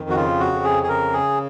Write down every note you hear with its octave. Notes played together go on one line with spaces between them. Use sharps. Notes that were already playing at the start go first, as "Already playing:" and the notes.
Already playing: F2 D#3
F#4
C#3 F4
F#4
F2
G#4
G#4
C#3 A#4
G#4